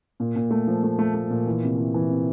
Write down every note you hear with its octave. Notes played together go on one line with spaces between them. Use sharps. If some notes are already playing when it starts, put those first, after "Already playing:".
A#2
A#2
A3
F3
A3
A3
A3
A#2
E3
C3
E3
E3
C3